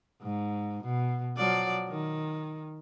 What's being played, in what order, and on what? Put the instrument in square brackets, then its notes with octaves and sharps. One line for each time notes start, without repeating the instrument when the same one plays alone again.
[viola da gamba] G#2
B2
F3 F#3 D5
D#3